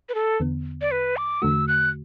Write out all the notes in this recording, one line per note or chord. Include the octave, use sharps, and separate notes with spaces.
B4
A4
E2 D3 B3
D5
B4
D6
E2 D3 A3 F#4 E6
F#6